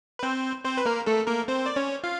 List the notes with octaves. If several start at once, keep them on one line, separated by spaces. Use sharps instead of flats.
B4
C4 C5
C4 C5
B4
A#3 A#4
A3 A4
A#3 A#4
C4 C5
D5
C#4 C#5
F4 F5